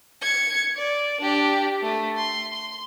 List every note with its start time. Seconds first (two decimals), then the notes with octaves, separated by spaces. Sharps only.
0.22 G#6 C#7
0.76 D5
1.21 D4 G4
1.82 A3
2.17 C6
2.53 C6